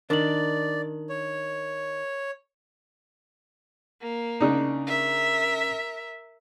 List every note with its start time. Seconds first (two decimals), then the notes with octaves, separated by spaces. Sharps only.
0.10 D#3 D4 A#4 D5 F#7
1.09 C#5
4.01 A#3
4.41 C#3 D4 D#4
4.87 A#4 E5